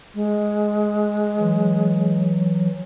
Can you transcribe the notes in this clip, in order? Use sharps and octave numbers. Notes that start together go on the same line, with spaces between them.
G#3
E3 F#3